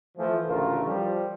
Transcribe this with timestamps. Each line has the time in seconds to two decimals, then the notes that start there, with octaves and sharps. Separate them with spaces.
0.18 E3 F3 A3
0.47 A1 D2 C#3 A3 F4 A#4
0.87 F3 G3